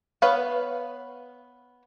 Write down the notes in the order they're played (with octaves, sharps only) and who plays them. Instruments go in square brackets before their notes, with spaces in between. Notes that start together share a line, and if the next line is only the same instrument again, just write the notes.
[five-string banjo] B3 B4 C#5 F5